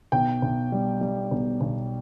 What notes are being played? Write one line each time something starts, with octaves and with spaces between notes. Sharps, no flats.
B1 G5
B1
G3
G3
B1
B1